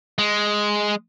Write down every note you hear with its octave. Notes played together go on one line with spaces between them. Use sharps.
G#3